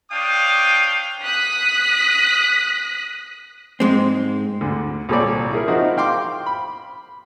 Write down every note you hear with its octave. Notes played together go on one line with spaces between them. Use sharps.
D4 C#5 F5 G5 D#6
D#6 F#6 B6
G#2 G#3 C4
D2 D3
C2 A#2 A4 C#5 D5
E4 G#4 A#4
F3 C4 D#4 E4 F#4
F5 G5 C6 D6
B5